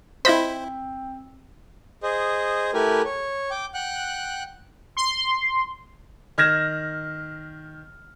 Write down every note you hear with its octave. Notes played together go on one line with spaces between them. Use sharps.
C4 E4 F4 C5 D#5 B5
G#4 C5 D#5
A3 E4 G4 A#4 B4 G#5
C#5
G5 D6
F#5 G5 F#6
C6
D#3 F6 G#6 A#6 E7